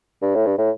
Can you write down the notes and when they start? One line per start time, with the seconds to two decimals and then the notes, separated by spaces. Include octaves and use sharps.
0.22 G2
0.35 A2
0.46 G2
0.58 A2